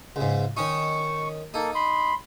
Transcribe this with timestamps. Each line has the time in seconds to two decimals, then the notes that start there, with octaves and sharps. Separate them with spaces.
0.16 C#2 G#2
0.57 D#3 C#4 D#4 C#6
1.54 A#3 D#4 A4
1.75 B5 C6